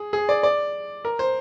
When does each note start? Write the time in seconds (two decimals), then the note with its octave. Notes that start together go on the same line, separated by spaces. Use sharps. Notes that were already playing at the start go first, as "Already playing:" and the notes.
Already playing: G#4
0.13 G#4
0.29 D5
0.43 D5
1.05 A#4
1.19 C5